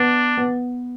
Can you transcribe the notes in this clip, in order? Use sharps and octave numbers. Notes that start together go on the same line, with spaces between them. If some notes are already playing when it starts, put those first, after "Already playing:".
Already playing: B3 D4
B3